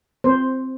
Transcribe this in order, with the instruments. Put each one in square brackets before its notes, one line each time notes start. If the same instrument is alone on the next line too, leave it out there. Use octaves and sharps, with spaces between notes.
[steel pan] C4 C5